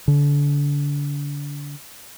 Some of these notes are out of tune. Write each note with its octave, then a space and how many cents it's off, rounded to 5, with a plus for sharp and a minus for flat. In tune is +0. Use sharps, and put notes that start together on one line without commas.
D3 -30